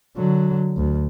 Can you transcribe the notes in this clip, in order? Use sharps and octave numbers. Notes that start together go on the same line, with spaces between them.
D3 F#3
D2